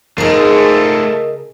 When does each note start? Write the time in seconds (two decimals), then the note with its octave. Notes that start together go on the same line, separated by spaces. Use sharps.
0.18 G#2 C#3 A3 F4 G#4 A#4 D#5